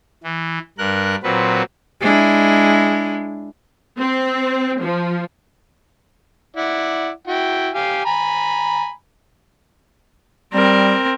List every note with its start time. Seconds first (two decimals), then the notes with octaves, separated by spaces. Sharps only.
0.24 E3
0.78 G2 A#4 F#6
1.23 A#2 F#3 C4 B4
2.01 G#3 D4 E4
3.99 C4
4.82 F3
6.57 E4 D5 F#5
7.27 E4 F#4 G5
7.75 G4 F5 G#5
8.05 G#5 A#5 B5
10.54 G3 C4 A#4